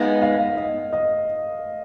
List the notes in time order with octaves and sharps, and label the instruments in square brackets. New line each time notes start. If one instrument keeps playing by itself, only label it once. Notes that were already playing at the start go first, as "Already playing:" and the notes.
Already playing: [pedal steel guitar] G#3 B3 D#4 [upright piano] F5
[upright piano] F5
D#5
D#5